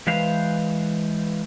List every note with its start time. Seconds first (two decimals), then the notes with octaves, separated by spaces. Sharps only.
0.07 E3 G#3 B4 C5 F5